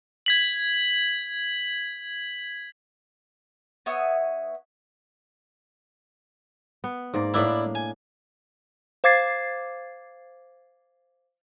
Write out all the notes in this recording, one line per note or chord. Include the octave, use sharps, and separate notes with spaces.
G#6 B6 F#7
B3 E4 C#5 D#6
B3
G#2 A#3 D5
A2 A#3 D4 E4 D5 B5
G#5
C5 F5 D6 G#6 A6 C7